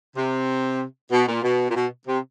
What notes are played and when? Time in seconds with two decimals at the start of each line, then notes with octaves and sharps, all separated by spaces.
0.16 C3
1.12 B2
1.28 A#2
1.43 B2
1.69 A#2
1.75 B2
2.07 C3